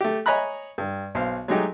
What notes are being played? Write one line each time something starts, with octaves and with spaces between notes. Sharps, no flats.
A3 G4
C#5 D#5 G#5 A#5 B5 F#6
G2
B1 C5 F5
F#3 G#3 A3 D#4 G4